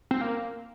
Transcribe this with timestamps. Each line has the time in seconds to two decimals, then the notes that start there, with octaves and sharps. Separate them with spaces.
0.11 C4
0.21 A#3